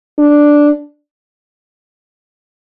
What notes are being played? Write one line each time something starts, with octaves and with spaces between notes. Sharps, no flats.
D4